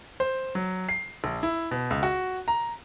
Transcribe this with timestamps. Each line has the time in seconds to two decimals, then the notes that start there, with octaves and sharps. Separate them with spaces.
0.20 C5
0.55 F#3
0.89 C7
1.24 A#1
1.43 E4
1.71 B2
1.90 C#2
2.03 F#4
2.48 A#5